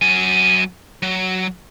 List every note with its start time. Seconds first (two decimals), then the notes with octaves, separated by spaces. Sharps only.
0.02 F#3 G#5
1.02 F#3